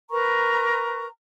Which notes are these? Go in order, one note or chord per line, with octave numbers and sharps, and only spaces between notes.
A#4 B4 A#5 C#6